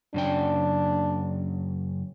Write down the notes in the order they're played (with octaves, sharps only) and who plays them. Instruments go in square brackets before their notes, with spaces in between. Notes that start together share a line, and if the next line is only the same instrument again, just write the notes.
[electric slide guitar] F#2 C#3 G5 [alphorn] D4